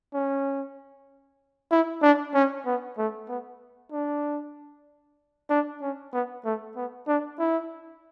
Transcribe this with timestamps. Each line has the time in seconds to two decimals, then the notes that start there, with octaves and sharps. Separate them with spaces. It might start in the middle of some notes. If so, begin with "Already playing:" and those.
0.14 C#4
1.71 E4
2.02 D4
2.34 C#4
2.66 B3
2.98 A3
3.28 B3
3.92 D4
5.50 D4
5.81 C#4
6.13 B3
6.45 A3
6.76 B3
7.07 D4
7.39 E4